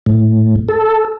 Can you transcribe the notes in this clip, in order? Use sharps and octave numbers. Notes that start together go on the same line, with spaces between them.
A2
A4